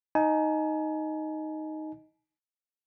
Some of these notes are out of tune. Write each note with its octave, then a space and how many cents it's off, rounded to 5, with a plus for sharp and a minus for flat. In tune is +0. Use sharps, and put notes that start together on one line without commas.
D#4 +0 G#5 +35